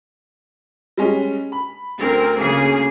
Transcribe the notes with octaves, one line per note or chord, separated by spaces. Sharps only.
G3 G#3 C#4
B5
D2 C4 A#4
C#3 A#3 G#4